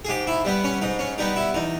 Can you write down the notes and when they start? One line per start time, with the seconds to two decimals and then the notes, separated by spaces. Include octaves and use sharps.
0.05 G#4
0.08 G#2 G4
0.27 E4
0.45 G3 B3
0.64 C#4
0.82 G#2 D#4
0.99 C#4
1.18 G3 B3 D#4
1.36 E4
1.54 E2 D#4